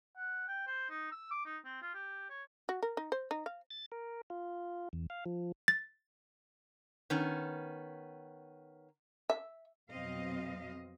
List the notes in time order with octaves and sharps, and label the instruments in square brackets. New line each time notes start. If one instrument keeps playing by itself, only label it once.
[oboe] F#5
G5
C5
D#4
E6
D6
D#4
C4
F4
G4
C#5
[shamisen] F#4
A#4
D#4
C5
D#4
F5
[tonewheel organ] A6
A#4
F4
E2
F5
F3
[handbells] A6
[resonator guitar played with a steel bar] D#3 B3 C#4
[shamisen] E5
[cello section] F2 B2 F#3 C4 D#5 F5